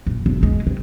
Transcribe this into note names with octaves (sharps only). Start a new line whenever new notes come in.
D#1
E1
G#3
C3